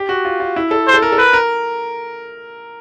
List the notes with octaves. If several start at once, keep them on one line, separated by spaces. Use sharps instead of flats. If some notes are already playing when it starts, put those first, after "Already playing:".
Already playing: G4
F#4
F4
F4
E4
A4
C5
A4
A#4
A4
A#4 B4
A#4